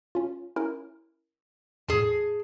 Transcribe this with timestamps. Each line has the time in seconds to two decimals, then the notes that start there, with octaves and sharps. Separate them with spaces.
0.15 C#4 F4
0.56 C#4 E4 A#4
1.88 E2 A2 G#4 A5